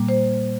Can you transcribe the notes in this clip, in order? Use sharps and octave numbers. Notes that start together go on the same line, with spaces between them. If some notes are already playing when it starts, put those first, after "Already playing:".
Already playing: A#2 G3 A#3
C5